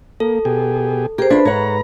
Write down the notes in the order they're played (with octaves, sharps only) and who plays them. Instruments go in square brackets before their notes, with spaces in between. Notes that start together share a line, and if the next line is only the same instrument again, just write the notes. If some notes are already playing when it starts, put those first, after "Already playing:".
[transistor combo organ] A#3 [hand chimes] A4
[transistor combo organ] B2 G4 G#4
[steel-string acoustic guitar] G4 [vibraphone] G#4 C5 [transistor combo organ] A#4
[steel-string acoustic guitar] D4 [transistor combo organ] F4 C5 [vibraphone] B4 B5
[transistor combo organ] G#2 A#5 [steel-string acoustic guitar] C#5 F#5